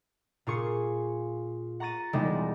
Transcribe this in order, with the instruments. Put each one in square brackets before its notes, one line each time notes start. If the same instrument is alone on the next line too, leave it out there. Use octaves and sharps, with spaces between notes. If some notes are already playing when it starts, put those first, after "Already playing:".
[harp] A#2 F4 G#4 C#6 C7 C#7
F#5 A#5 C#6 A6 D#7
E1 E3 G3 G#3 D#4